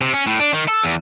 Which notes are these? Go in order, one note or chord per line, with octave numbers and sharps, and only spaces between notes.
C3
C#4
A2
D4
D#3
A4
E2